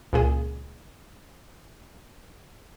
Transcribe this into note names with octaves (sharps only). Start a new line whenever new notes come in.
C#2 A#2 G#4